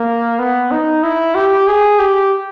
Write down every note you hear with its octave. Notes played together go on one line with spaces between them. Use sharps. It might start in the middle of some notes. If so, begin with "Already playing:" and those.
Already playing: A#3
B3
D#4
E4
G4
G#4
G4